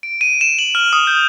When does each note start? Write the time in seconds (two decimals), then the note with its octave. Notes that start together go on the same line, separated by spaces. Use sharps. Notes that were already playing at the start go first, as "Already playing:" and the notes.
0.03 D7
0.21 D#7
0.41 E7
0.59 F#7
0.75 F6
0.93 D#6
1.07 G6